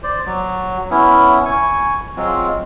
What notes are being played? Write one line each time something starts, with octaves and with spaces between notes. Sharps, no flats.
C5 D5
F#3
B3 C#4 E4
G#5 C#6
F#3 G#3 C4 F4